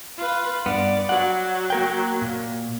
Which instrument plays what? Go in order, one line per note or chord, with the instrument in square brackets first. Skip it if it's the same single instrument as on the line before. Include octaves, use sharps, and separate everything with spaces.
[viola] F4 B4
[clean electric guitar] G2 B3 [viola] D5
[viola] F#3 [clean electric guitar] F#5
[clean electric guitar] A#3 A#4 G5
A#2